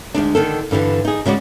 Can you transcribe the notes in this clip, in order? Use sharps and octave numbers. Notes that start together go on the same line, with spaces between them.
D2 G#3 D4
D3 D#3 A4
G2 D3 E3 G3
D#4 G#4
C#3 G#3 F#4 D5